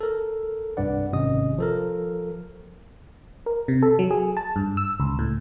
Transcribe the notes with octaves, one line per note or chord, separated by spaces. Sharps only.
A4 A#4
C2 G2 B4 D5 F#5
G#1 C3 C#4 D#5 D#6
F3 A4 A#4
A#4
C3
A4
F#3
G#4
A5
G2
E6
C#2
A2